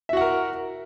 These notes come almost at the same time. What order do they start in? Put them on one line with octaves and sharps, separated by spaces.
E5 F#4 F#5 A#4